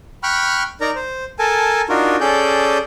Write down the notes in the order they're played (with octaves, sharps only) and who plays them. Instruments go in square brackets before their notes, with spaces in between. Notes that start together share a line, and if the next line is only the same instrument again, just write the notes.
[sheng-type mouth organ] G5 B5 C#6 F6 F#6
D#4 A#4 D5 A#5
C5
A4 A#4 G#5 A5
D4 D#4 F4 F#4 A#4
C#4 G#4 A4 D5 G6